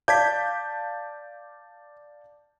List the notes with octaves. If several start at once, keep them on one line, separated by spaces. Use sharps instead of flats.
D5 F5 A5 G6 G#6 B6